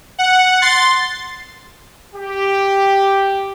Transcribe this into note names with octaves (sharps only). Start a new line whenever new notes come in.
F#5
C6 A6
G4